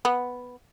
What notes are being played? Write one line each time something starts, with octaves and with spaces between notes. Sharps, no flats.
B3